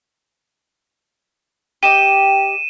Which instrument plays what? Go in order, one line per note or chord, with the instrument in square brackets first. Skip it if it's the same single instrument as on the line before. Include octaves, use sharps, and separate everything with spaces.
[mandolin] G4 D#5 [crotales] D#7 E7